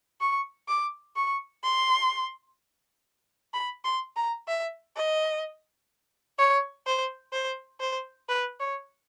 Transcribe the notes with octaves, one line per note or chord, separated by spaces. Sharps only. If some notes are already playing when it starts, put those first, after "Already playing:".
C#6
D6
C#6
C6
B5
C6
A#5
E5
D#5
C#5
C5
C5
C5
B4
C#5